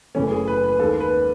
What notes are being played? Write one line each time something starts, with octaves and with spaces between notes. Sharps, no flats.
F#1 F#2 E3 A3 C#4
G#4
B4
B4
D#2 D#3 G#3 A4
B4